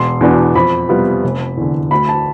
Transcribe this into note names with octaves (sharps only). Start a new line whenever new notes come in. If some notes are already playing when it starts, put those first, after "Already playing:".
Already playing: E1 C6
E2 B2 B3 D4
F2 B5
C3 G3 B3 F4
F1
E2 D3
D2 B5
A5